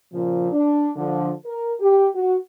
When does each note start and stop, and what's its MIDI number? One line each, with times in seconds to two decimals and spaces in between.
0.13 0.50 46
0.13 0.50 49
0.13 0.50 53
0.52 0.90 62
0.96 1.31 50
0.96 1.31 53
1.46 1.73 70
1.80 2.08 67
2.15 2.36 66